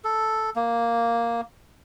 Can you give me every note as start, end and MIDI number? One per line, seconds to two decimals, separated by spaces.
0.04 0.50 69
0.56 1.41 58